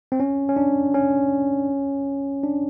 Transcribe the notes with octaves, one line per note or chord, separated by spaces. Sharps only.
C4
C#4
C#4
D4
C#4
D4